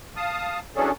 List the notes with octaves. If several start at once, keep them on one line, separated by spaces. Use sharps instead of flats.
F5 A5 D#6
E3 F#3 C#4 D4 G#4 A4